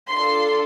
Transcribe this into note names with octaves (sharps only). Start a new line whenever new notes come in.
D4 F4 A4 C6